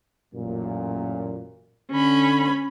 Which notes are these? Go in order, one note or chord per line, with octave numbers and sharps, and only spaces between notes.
A1 F#2 A#2
D3 C#4 B5